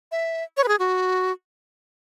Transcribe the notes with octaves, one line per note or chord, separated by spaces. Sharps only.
E5
C#5
B4
G#4
F#4